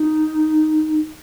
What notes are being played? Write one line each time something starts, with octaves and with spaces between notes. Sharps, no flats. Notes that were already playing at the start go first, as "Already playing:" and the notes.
Already playing: D#4